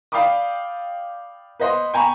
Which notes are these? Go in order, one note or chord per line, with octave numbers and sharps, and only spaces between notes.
D5 F5 G5 B5 D6 D#6
B4 C5 D#5 F#5 C6
G5 G#5 A#5 B5 C#6